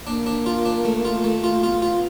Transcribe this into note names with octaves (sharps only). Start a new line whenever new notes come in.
A#3 D4
D4
F4
D4
A3
F4
A3
F4
B3 F4
F4